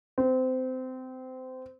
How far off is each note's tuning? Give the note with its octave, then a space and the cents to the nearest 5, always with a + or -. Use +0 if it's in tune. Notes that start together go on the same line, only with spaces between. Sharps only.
C4 -25